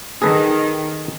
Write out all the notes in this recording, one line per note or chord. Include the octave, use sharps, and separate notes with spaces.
D#3 G#4 A4 B4